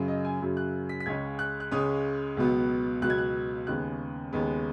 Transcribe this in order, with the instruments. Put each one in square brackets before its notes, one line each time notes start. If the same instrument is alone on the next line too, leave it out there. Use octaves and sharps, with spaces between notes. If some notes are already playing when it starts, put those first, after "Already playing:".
Already playing: [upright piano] F#2 C#3 F#3
D#5
G#5
F#2 C#3 F#3
F#6
B6
B6
C#2 C#3 G#3 C#4 G#6
F#6
F#6
C#2 C#3 G#3 C#4 D#6
C#2 B2 F#3 B3
C#2 B2 F#3 B3 F#6
G#6
F#6
D#2 C#3 G#3 B3 F#6
D#2 C#3 G#3 B3